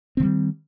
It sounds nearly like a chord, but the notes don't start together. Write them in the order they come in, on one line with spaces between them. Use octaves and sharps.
C4 D3 G3 D#3